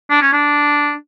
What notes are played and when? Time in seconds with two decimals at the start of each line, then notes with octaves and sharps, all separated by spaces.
0.10 D4
0.22 C#4
0.33 D4